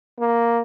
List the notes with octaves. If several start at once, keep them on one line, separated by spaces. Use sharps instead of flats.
A#3